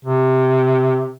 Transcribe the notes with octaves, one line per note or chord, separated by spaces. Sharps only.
C3